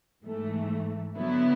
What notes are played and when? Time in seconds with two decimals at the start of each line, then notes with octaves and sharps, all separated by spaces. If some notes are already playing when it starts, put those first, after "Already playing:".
0.23 G#2 E3 A3
1.16 D3 F#3 B3 E4